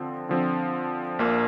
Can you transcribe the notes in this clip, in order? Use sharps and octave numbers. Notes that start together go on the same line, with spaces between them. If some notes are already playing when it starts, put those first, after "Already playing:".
Already playing: D3 F3 C4
D3 F3 C4
A#1 A#2 A#3